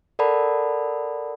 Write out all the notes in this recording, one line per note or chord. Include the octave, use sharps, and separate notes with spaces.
A4 A#4 D5 F#5 A5 B5